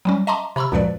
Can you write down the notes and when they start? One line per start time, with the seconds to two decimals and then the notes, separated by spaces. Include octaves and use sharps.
0.05 F#3 G3 C#4
0.27 D#5 E5 A5 A#5 C6 D6
0.56 C3 A#5 B5 C#6 E6
0.72 C#2 F#2 A#2 F3 B4 D5